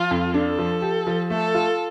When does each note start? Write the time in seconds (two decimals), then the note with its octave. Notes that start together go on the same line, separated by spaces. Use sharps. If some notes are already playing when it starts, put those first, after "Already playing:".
Already playing: F3 F4
0.11 F2
0.34 D4 A4
0.58 F3
0.82 G4
1.07 F3
1.30 A3 A4
1.55 F4